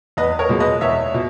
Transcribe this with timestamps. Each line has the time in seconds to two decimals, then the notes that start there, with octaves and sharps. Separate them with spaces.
0.17 E2 B4 D#5
0.39 A#4 C#5
0.49 B2 G#3
0.60 B4 D#5
0.81 E2 C#5 E5
1.14 B2